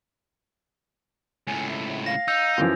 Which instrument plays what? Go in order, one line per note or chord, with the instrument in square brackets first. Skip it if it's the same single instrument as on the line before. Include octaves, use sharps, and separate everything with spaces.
[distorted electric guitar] C#2 A2 [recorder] G#5
[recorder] E5
[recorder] F5 [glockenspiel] A#6
[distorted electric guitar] D#4 [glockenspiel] E6 G6 F7
[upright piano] F#2 E3 F3